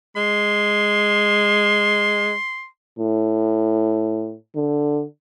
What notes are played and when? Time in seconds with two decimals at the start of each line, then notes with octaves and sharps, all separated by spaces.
0.16 G#3 C6
2.99 A2
4.55 D3